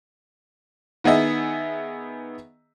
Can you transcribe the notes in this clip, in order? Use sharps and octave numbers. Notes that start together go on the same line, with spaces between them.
D#3 B3 G#4 D#5 E5